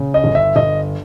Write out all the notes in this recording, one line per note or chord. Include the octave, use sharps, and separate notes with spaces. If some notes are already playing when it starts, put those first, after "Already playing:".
Already playing: C#3
D#5
G1
E5
G1 D#5